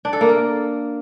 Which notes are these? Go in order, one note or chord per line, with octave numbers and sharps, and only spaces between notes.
D4
A4
A#3
A#4